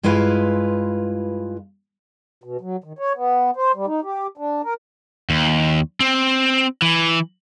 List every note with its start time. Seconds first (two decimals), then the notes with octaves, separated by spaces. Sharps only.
0.03 G2 G#3 E4 F4 B4 F5
2.44 B2
2.61 F#3
2.84 D#3
2.99 C#5
3.15 B3
3.57 C5
3.75 G3
3.87 D#4
4.03 G4
4.37 D4
4.64 A#4
5.30 D#2
6.00 C4
6.82 E3